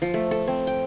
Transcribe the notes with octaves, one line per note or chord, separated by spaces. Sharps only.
F3
A3
A4
C4
G5